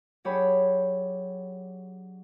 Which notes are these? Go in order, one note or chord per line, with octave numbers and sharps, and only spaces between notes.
F#3 D4 G4 G#4 C#5 B5